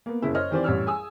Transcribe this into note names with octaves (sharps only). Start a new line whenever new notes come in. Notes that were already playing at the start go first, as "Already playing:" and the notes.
A#3 B3
F#1 C#3 E4
C5 C#5 D#5 F6
D#3 E3 C4 G4 C5 D5
A1 G3 C#5 E6 F6
G#4 G#5 D#6 E6